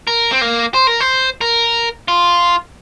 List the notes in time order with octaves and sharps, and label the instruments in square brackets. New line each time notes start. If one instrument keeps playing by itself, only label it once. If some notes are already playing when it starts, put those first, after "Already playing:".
[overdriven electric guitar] A#4
C4
A#3
C5
A#4
C5
A#4
F4